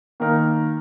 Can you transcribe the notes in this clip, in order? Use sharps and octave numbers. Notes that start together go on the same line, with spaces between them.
D#3 A#3 D#4 A#4